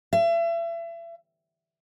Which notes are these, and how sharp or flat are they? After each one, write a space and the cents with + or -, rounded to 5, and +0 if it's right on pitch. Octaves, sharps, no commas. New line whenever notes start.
E5 +35